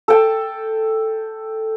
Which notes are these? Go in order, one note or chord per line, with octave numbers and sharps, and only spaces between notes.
A4 G5 A5